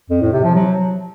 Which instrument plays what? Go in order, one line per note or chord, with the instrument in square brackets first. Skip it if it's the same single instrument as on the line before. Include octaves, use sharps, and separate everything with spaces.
[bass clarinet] F2
A2
C3
F3
F#3